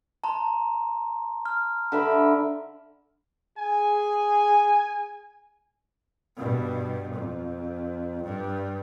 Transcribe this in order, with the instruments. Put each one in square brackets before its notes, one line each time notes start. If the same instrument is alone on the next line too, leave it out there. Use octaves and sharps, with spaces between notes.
[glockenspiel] A5 A#5 C6
F6
[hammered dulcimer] D3 E5 B5
[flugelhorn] G#4 [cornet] G#5
[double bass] G2 B2
F2
G2